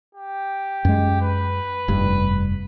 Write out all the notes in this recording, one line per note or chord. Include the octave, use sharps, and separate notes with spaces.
G4
F#2 G#3
B4
F1 G2